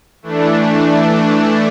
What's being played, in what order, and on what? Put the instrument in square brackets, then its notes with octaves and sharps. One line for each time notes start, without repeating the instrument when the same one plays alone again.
[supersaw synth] E3 A3 D4